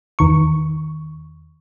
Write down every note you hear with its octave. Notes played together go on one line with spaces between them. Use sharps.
E2 D#3 C#6